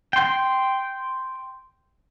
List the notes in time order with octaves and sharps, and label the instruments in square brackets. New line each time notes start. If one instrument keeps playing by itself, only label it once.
[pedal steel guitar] G5 C6